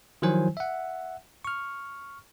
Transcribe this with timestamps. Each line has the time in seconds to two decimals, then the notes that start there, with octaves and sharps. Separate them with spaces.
0.22 D#3 F3 F#3 E4 C5 G#5
0.57 E5 F#5
1.45 C#6 F6